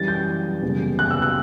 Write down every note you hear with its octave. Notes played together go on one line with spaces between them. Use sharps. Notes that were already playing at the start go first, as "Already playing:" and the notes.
Already playing: F#2 E3 G3 A6
G6
F#1 E2 B2 G3
F#6
E6
F#6